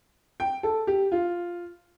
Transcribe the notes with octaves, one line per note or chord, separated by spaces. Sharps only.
G5
A4
G4
F4